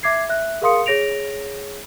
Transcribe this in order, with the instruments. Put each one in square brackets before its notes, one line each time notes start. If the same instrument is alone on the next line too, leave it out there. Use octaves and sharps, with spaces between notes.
[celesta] E5 D6 G#6 C7
E5 F#6
G#4 A#4 F5 C6 D#6 C#7
G#4 C#5 A#6 D7 F7